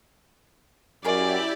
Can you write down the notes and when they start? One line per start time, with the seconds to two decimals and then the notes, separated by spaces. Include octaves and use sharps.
1.04 F#2 E4 G4 G#4 A#4 C#5 D5